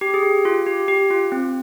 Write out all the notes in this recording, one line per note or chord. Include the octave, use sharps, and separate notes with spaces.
G4
G#4
G4
F4
G4
G4
F4
C4